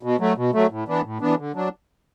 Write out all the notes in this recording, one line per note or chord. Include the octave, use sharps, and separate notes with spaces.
B2
F#3 A3
B2
F#3 A3
A2
E3 B3 D4
A2
E3 B3 D4
D3
F#3 D4